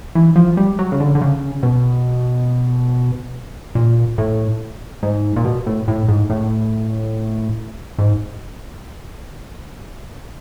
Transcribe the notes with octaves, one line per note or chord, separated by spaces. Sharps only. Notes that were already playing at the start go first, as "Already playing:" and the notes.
E3
F3
G3
F#3
C#3
D3
D3
C#3
B2
A#2
A2
G#2
A#2
B2
A2
A2
G#2
A2
G#2